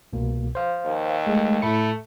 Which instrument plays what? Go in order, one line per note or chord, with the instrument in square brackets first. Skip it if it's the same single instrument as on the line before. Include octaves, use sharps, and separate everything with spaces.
[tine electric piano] C2 B2 A#3
C5 F5
[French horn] D#2
[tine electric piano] G#3 A3
[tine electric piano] A2 B5 C#7 [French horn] A3